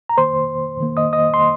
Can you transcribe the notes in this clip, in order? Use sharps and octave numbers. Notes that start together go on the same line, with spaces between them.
A#5
D#3 A#3 C5 C6
D#3 A#3
D#5 D#6
D#5 D#6
C6